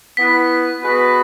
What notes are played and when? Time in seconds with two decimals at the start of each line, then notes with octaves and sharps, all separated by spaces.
0.17 B3 E4 B4 B6
0.82 G#3 B3 F#4 B4